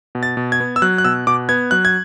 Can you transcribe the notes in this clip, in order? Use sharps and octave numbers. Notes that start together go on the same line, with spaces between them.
B2
A6
B2
G#6
B3
E6
F#3 F#6
F#6
B2 E6
B2 D6
B3 G#6
F#3 F#6
G#6